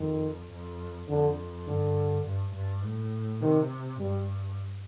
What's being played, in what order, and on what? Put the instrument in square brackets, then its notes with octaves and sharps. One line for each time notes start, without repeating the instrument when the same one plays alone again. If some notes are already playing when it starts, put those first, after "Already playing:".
Already playing: [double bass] F2 [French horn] D#3
[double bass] F2
[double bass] F2 [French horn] D3
[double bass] G2 [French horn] D3
[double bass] G2
G2
A2
[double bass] C3 [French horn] D#3
[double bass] G2 [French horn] G3